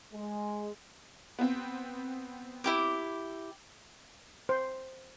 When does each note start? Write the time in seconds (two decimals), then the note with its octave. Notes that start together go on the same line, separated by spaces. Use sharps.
0.13 G#3
1.39 B3 C4
2.64 E4 G4 D6
4.49 C5